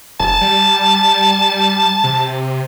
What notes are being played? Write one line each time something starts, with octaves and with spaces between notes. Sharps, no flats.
F1 A5
G3
C3